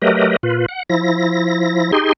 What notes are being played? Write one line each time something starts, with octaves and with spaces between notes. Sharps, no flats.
F#3 A3 G4 A#4 B4 D#5
A#2 F4 B4
F#5
F3 E4 A#6
D#4 G4 G#4 C6